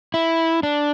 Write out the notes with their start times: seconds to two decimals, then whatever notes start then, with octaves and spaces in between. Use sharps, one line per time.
0.14 E4
0.63 D4